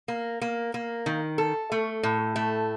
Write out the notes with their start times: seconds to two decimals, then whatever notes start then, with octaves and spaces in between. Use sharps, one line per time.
0.08 A#3
0.41 A#3
0.74 A#3
1.06 D#3
1.38 A4
1.72 A3
2.03 A2
2.36 A3